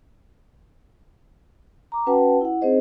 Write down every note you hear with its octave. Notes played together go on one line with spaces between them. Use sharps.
A#5 D6
C#4 F#4 B4 F#5 G5 A5
E4 F#5
C4 D#4 G#4 C5 D#5